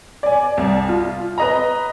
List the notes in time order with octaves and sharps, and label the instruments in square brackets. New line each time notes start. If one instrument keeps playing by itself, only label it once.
[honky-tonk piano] D5 G#5
C2
F4
B4 D#5 A#5